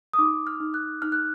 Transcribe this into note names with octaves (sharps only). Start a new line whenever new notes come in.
D#6
D#4 D6
F6
D#4
F#6
D#4 F6
F#6